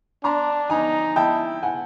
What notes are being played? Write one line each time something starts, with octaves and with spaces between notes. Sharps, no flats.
D4 A#5 C6
D#4 G#5 A#5
E4 G5 A5
F#5 G#5